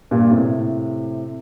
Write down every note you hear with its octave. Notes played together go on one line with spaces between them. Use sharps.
G2 A#2
A2 C3